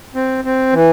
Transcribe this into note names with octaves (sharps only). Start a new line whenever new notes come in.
C4
C4
E3